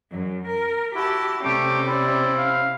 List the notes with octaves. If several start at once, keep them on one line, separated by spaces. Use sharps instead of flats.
F#2
A#4
E4 F#4 G4 A5
C3 G3 A3 C#4 G4 D6
E4 C5 D5
F5